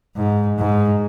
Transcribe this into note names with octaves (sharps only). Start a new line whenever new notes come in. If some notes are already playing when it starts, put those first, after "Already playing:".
G#2
G#2